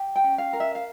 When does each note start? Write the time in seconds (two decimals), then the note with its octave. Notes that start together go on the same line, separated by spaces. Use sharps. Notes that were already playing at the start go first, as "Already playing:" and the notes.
Already playing: G4
0.16 G5
0.24 C#4
0.38 F5
0.53 A#4
0.60 E5
0.75 F5